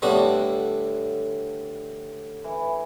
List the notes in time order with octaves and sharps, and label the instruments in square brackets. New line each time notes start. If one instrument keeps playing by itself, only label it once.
[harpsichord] A2 G3 B3 D4 F#4 [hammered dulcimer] D3
[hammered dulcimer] E3